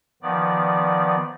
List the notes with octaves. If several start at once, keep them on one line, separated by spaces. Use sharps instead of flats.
D#3 F3 B3 D5